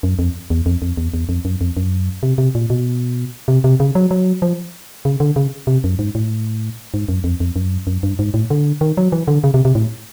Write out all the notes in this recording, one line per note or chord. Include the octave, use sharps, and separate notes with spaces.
F#2
F2
E2
F2
F2
E2
E2
F2
F#2
F2
F#2
C3
C3
A#2
B2
C3
C3
C#3
F#3
F#3
F3
C#3
D3
C#3
C3
F#2
G#2
A2
G#2
F#2
F2
F2
F#2
F#2
G2
G#2
A2
D3
D#3
F#3
E3
D3
C#3
C3
C3
A2